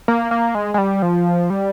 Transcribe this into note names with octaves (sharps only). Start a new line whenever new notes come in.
A#3
A#3
G#3
G#3
G3
F3
G3